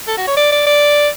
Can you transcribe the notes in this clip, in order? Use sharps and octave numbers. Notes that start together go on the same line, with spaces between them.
A4
F#4
C#5
D5
D5
D5